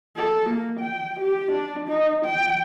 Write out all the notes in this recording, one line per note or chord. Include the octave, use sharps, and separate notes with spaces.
A4
A#3
G5
G4
D4
D#4
G5